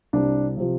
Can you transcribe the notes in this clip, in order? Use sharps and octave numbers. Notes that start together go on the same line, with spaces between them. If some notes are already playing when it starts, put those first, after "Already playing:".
C2 D4
C3 F3